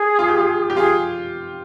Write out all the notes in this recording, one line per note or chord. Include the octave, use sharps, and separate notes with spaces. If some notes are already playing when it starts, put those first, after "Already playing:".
Already playing: G#4
F4
G4
F4
G4
F4 G#4